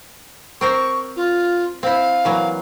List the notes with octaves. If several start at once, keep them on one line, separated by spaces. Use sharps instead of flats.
C4 A#4 C5 C#6
F4
C4 E4 F5
E3 F#3 A#3